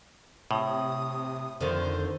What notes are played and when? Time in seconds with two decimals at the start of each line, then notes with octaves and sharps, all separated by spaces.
0.51 A2 C3 D#6
1.61 F2 D3 D#3 C5